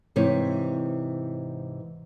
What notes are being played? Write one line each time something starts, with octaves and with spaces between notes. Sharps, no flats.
G#2 C3 E3 C#5